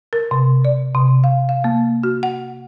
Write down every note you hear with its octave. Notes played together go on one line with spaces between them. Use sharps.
A#4
C3
D5
C3
F5
F5
A#3
F#4
F#5